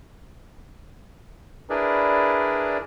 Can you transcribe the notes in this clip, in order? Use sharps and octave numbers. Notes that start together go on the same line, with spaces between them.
D4 E4 G#4 A#4 B4 D5